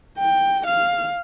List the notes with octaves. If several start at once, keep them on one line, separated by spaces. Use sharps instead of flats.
G5
F5